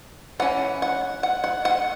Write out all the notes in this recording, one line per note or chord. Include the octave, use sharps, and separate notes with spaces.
E3 C#4 F#5
F#5
F#5
F#5
F#5